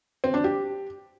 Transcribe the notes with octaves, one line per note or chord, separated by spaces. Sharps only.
C4
D4
G4